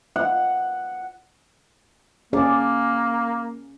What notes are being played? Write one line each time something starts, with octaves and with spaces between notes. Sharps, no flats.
F#5
A#3 C#4 G#4 D5